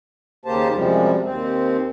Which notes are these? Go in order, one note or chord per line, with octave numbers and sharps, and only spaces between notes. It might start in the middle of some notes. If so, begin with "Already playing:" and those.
D#2 C#3 A#3 G4 C5 A5
F#2 C3 F3 G3 G#3
D#2 C4